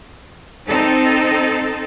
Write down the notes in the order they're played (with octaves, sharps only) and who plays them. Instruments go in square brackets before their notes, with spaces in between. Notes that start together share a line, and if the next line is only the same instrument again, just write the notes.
[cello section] C4 D#4 A4